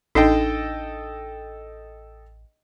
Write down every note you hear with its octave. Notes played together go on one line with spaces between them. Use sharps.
A1 D4 D#4 A4 D#5 G5